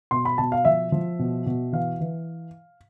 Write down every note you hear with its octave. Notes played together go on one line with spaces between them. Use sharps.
B2 C6
B5
B2 A5
F5
F3 E5
F3
B2
B2
E3 F5
E3